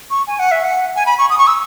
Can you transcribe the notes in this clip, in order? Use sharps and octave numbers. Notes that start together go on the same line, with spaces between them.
C#6
G#5
F#5
E5
F#5
G#5
B5
C#6
D#6
C#6
E6